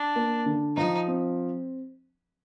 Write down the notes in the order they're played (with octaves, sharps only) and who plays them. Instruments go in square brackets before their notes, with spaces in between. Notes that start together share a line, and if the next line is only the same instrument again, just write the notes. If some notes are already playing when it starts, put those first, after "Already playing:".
Already playing: [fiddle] D4
[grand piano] A#3
D3
[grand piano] F3 [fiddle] D#4
[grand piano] C4